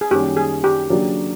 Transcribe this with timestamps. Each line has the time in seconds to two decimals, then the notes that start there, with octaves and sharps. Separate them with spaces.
0.01 G#4
0.11 F#2 D#3 G3 A#3 C#4 G4
0.37 G#4
0.64 G4
0.90 C#3 F#3 A#3 D4 G4